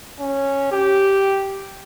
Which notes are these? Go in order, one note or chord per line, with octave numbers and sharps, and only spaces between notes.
C#4
G4